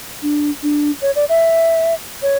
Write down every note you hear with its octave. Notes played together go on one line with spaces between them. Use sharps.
D4
D4
C#5
D5
E5
C#5